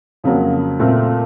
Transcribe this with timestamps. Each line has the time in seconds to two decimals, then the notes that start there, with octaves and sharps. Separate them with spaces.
0.24 F2 C#3 F#3 A#3
0.79 A#2 A3 C4